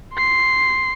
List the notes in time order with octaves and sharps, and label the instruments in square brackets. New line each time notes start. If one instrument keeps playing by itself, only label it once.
[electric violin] C6 C7